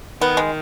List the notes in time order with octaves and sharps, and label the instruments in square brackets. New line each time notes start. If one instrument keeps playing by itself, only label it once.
[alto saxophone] D#3 [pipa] B3
[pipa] G#3